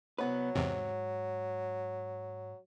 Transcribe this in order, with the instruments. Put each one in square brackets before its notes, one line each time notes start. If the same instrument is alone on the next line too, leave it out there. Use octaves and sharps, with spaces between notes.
[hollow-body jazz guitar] C2 B3 B4 [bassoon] F#3
[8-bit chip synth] E2 C3 [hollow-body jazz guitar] G#2